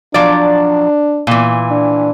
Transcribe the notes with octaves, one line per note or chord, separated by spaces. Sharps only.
F3 F#3 D4 D5
A#2 E3
D4